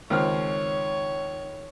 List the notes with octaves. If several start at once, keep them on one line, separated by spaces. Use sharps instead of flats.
C#2 D#3 C4 C#5 F6